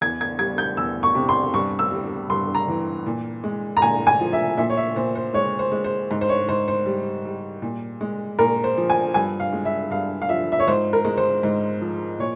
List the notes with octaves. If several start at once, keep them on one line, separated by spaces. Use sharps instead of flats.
E2 G#6
G#6
G3 G#6
G6
E2 E6
C#6
C3
C6
G2 C#6
E6
G3
G2 C6
A#5
E3
A#2
G#3
A#5
A#2 G#5
G#5
F3
E5
A#2 E5
C#5
E5
A#2 C5
C5
G#3 C#5
C5
G#3
C5
G#2
C5
C#5
G#2 C5
C5
G3
G3
A#2
G#3
A#2 A#4
C5
F3
G#5
G2 G#5
F5
G#3
E5
G2 F5
F5
F3 E5
E5
C#5
G#2 C5
A#4
G#3
C5
G#2
F3
A#2 C#5